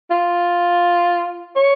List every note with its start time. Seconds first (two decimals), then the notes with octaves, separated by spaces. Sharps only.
0.11 F4
1.56 C#5